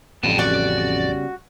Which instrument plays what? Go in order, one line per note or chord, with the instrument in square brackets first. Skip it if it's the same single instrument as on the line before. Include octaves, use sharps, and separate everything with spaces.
[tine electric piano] A1 F2 [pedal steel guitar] C#3 G3 B3 [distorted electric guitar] G5 A5
[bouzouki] F#4 [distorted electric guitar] D5